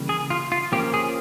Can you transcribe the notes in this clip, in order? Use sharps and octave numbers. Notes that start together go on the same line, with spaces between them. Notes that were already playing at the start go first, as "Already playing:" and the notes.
Already playing: C#3 E3 G3 A#3
G#4
F4
F4
F3 A#3 C#4 G4
G#4